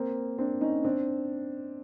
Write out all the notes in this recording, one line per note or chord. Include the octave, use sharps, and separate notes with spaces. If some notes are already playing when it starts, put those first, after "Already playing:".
Already playing: A#3 C4
C4 D4
C#4 D#4
C4 D4